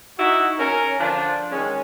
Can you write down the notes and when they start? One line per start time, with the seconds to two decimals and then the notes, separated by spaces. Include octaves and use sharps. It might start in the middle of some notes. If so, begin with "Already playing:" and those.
0.18 D#4 E4 F#4
0.59 C#4 A#4
0.99 D3 F3 D4
1.52 D#3 G#3 C#4